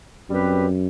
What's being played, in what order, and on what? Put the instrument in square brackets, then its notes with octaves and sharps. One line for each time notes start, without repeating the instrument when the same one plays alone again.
[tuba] F#2 [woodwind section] G3 C4 G4 B4